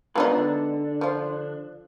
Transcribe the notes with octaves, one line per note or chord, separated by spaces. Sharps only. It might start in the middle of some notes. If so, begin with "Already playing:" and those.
G#3 B3 D4 D#4 F4 B4
D3 D4
F3 F4